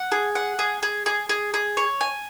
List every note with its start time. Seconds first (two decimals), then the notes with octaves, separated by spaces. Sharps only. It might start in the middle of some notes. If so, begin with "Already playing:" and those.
Already playing: F#5
0.12 G#4
0.35 F#5
0.59 G#4
0.83 G#4
1.06 G#4
1.29 G#4
1.54 G#4
1.77 C#5
2.01 G#5